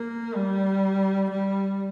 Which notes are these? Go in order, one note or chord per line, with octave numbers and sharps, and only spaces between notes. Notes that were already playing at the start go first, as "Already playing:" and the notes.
Already playing: A#3
G3
G3